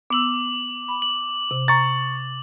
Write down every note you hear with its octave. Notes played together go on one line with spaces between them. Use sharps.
B3 D6 E6 F#7
B5
F#7
C3
A#5 C#6 A6